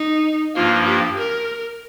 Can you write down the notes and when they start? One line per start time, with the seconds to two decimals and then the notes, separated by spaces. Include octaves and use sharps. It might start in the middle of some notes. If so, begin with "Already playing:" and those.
Already playing: D#4
0.55 G2 F3 A#3 F4
0.87 G4
1.18 A#4